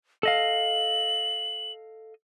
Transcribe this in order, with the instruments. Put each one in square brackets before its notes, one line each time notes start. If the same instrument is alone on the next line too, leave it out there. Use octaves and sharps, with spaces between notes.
[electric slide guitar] A4 D#5 F5 [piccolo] F#7